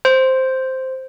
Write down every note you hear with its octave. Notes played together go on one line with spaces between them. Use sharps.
C5